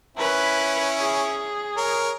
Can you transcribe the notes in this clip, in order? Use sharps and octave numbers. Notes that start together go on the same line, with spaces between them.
C#4 E4 B4
G#4
A#4 C#5